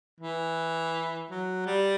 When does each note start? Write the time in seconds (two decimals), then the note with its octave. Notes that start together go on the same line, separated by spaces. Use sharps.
0.20 E3
1.30 F#3
1.66 G3